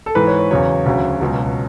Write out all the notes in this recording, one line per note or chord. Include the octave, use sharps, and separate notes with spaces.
A4
G#2 E3 B4
C#5
C#5
E2 C#3 F#3 C#5
D2 C#3 F#3
C#2 B2 F#3